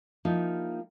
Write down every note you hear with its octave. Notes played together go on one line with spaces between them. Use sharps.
F3 A#3 D#4 E4 G4